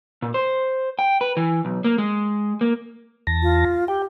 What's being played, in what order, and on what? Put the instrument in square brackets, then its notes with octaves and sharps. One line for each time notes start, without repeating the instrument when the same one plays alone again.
[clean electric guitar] A#2
C5
G5
B4
E3
B1
A#3
G#3
A#3
[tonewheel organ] E2 A5 A#6
[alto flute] F4
[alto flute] G4 [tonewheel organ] G5